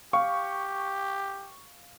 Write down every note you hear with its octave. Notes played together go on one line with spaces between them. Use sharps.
G4 F5 C#6